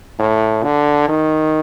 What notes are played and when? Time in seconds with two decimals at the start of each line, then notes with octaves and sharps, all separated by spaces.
0.19 A2
0.64 D3
1.08 D#3